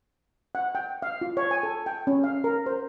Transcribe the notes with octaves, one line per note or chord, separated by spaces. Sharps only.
F#5
G5
F5
F4
C#5
G#5
A4
G5
C#4
F5
A#4
C5